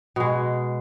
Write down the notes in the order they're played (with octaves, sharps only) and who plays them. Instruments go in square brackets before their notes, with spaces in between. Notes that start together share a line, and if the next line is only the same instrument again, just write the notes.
[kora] B2 G#3